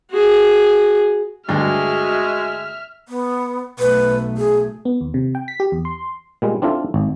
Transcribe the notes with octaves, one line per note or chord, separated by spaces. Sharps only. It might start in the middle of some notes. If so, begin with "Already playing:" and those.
F#4 G#4
D2 G2 G#3 F#4 E5 F6
B3
B1 A3 B4
G#4
B3
D#2
C3
G5
B6
G4
E2
C6
A#2 G3 G#3
C4 D4 E4 F4 A4
G#1